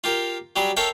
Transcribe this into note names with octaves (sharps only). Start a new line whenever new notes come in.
F4 G4 A#4
F#3 G3 G4 G#4
A4 A#4 C#5 E5 F5 G5